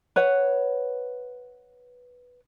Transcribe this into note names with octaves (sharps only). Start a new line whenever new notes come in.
B4 C#5 F#5